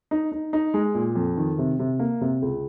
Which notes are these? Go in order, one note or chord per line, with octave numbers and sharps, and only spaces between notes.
D#4
D#4
D#4
G#3
A#2
F2
D#3
C3
C3
A#3
C3
C#2